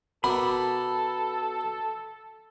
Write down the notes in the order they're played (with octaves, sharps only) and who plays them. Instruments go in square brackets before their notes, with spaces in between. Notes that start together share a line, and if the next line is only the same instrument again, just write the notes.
[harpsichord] B2 A#4 [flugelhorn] A4 [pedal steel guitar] B5 D6